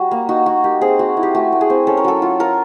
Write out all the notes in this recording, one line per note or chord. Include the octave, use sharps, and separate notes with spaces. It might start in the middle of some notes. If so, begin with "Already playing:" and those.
Already playing: G3 F#4
A#3
D#4 F#4
A#3 F#4
A#3 G4
C4 G#4
C4 F#4
E4
G4
A3 F#4
A3
G#4
C4
C#4 A4
A#4
F#3 A4
F4
F4 A#4